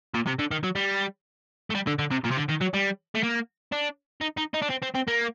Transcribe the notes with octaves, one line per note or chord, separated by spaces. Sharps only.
A#2
C3
D3
D#3
F#3
G3
A3
G3
D3
D3
C3
A#2
C3
D3
D#3
F#3
G3
A3
A#3
D4
D#4
D#4
D#4
D4
C4
C4
C4
A#3